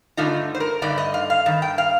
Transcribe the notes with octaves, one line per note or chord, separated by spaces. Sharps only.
G2 D3 A3 D#4 F4
C5
A#4
G2 D3 A3 D#4 D5
D#5
F5
F5
G2 D#3
G5
F5